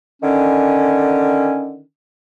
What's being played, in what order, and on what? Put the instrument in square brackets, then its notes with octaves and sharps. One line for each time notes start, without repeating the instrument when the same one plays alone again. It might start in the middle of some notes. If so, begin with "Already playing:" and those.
[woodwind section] D3 D#3 C#4